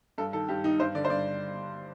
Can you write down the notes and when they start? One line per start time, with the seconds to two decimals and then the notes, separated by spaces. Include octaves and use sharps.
0.18 G2 A4
0.33 D#3 A4
0.48 G2 G4
0.64 D#3 D#4
0.79 G2 C5
0.95 D3 D5
1.05 C5
1.10 G2 D5